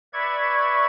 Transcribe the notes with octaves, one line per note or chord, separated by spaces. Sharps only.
B4 D5 E5 C#6 G#6